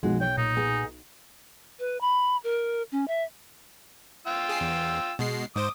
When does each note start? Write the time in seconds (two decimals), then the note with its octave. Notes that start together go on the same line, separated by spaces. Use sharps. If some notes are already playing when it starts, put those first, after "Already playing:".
0.03 B1 F3 G#3 F#4
0.21 C#5 G5
0.37 A#2 D#4
0.56 B3 G#4
1.79 B4
2.01 B5
2.44 A#4
2.92 C#4
3.08 E5
4.27 F4 G5 E6
4.49 G#4 C7
4.61 E2
5.19 B2 G#3 C7
5.56 G#2 C5 D6 D#6